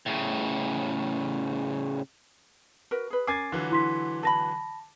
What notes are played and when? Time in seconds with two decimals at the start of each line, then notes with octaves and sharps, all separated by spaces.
0.06 A2 C#3
2.91 F#4 A#4 B4
3.10 G#4 B4
3.27 C#4 A#4 G#5 D6 G#6 A6 C7
3.52 D3 E3 F#3 F4
3.71 E4 C6 B6
4.23 A4 A5 B5 A#6